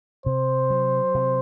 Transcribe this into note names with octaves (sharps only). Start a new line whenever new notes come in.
C3 C5
F#3
C3